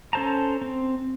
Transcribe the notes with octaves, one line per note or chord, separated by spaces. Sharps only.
C#4 A4 C5 A5 A#5
C4